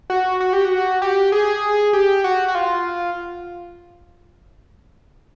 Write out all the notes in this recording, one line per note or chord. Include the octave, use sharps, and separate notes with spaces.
F#4
F#4
G4
F#4
G4
G#4
G4
F#4
F#4
F4